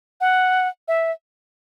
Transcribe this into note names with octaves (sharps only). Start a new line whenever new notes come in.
F#5
E5